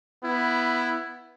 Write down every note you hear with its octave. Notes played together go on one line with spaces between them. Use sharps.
B3 E4